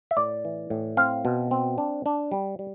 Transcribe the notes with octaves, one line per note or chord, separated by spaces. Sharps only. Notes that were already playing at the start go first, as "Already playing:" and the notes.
E5
A2 D5
E3
A2
C4 F5
B2
C4
D4
D4
G3
G3